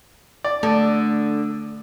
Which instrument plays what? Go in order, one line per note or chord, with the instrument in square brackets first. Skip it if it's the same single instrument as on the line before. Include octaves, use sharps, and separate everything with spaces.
[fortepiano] D5
[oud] D3 [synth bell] A3